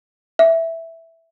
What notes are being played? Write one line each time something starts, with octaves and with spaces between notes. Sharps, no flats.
E5